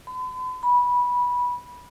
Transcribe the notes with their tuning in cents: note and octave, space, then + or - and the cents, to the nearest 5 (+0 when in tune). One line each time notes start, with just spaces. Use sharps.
B5 +45
B5 -15